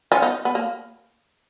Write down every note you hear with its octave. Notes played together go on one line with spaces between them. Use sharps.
C#4 F4
B3 D#4
B3
A#3